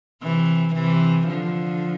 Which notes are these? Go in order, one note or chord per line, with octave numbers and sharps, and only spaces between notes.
C3 E3
C3 E3
D3 F3